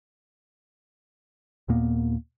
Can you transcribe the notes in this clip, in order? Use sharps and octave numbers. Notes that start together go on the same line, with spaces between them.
D#2 A#2 A#3 B3